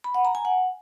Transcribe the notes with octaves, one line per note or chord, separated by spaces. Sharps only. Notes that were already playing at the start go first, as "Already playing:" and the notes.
B5
F#5
A#5
G#5
F#5